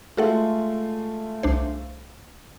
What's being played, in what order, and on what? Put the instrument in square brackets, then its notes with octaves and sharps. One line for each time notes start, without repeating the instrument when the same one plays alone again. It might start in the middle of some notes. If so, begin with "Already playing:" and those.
[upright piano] G#3 A3 F4 [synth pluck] F#4 A4 F#5
[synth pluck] C2 D4 C5